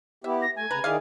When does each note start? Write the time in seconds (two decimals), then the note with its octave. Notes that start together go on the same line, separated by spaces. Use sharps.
0.24 B3 E4 G4 E5
0.42 A#6
0.56 A3 G#5
0.71 C#3 B4 A#5
0.84 D#3 E4 G#4 D5 D#5 F5